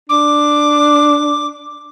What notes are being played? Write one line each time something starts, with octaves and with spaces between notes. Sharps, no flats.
D4 D6